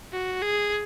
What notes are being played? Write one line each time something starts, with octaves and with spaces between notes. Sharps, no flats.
F#4
G#4